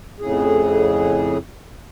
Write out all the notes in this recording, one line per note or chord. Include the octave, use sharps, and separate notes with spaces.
F2 A2 C#3 G#4